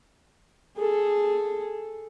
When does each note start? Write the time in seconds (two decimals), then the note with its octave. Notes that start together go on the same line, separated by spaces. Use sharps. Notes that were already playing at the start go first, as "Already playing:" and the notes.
0.78 G#4 A4